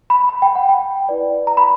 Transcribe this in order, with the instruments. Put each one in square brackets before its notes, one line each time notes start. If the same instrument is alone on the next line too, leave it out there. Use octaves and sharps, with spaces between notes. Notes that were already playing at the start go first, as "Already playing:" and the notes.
[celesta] B5
B5
G5
F#5
G5
E4 B4 D5
A#5
B5